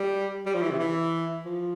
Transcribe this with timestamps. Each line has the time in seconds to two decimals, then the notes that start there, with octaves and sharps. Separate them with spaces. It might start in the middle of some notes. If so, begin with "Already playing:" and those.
Already playing: G3
0.46 G3
0.55 F3
0.62 E3
0.71 C3
0.79 E3
1.45 F3